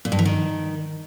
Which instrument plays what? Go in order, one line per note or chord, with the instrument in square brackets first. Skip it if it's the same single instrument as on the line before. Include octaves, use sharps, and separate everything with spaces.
[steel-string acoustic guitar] A#2
G2
E3
D#3